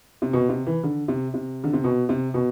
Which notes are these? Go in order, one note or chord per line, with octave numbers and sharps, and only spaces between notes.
C3
B2
C3
E3
D3
C3
C3
D3
C3
B2
C3
B2